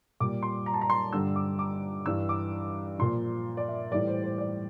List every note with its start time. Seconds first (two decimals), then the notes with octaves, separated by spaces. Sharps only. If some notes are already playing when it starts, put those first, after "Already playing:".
0.20 A#2 G3 D6
0.43 C6
0.66 A#5
0.74 A5
0.81 A#5
0.90 C6
1.13 G2 D3 G3 E6
1.36 D6
1.59 D6
2.05 G2 E3 G3 E6
2.29 D6
2.99 A#2 F3 C6
3.57 D5
3.69 E5
3.92 A2 E3 G3 D5
4.07 C5
4.24 C5
4.38 D5